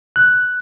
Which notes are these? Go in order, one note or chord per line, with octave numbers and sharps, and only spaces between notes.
F#6